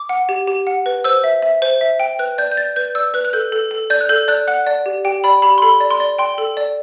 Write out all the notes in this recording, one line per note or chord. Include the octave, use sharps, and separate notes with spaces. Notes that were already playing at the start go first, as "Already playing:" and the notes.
Already playing: D6
F#5
G4
G4
F#5
B4
C5 E6
E5
E5
C5
E5
G5
B4 F#6
D5 G6
G6
D5 A6
B4 G6
D5 E6
B4 F#6
F#6
A4 G6
A4
A4
D5 G6
F#6
A4 G6
D5 F#6
F#5 F#6
D5
G4
G4 G5
D5 B5
G4 B5
C6
A4 B5
D5
C6
D5
G5 C6
A4
D5